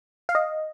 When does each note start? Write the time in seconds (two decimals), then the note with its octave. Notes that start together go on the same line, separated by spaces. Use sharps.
0.29 F5
0.35 D#5